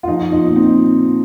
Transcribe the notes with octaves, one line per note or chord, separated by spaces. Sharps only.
F4
F3 D#4
D#4
A#2
C4